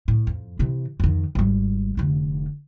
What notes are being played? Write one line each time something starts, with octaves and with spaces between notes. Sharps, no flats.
A2
F2
C3 E3
F2 D#3
G#1 G3
F1 D3